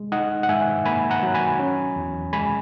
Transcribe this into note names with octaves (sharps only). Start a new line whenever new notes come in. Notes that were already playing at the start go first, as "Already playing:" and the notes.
Already playing: G#3
D#4 D#5 F#5
F#5
G#2 E5 G#5
A#3 G#5 B5
F#5 A#5
F#3
G#5 B5
C#4
E2
G#3 G#5 B5